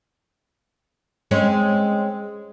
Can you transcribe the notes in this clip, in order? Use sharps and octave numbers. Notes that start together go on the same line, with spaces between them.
G#3 C4 C#4